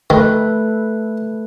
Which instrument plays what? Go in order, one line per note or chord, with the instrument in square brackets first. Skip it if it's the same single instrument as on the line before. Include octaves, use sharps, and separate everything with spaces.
[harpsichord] D#3 [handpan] A3 A4 B4